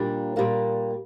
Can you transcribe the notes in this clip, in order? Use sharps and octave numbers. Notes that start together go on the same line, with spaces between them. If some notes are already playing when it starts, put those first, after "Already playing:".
Already playing: A#2 G3 A#3 D4
A#2 G3 A#3 D4